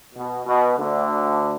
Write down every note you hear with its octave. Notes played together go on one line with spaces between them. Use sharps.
B2
B2
D2 D3